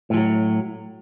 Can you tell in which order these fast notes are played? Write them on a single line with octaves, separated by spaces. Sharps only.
A2 F3 F#3